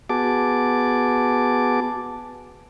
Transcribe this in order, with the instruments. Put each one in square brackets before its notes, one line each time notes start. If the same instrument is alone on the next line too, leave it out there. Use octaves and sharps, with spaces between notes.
[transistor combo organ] B3 F#4 G#4 A5 D6